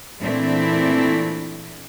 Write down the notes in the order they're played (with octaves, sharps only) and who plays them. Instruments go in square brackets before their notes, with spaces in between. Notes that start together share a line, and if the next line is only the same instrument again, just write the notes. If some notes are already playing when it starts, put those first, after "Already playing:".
[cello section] A#2 E3 A3 C4 D4 E4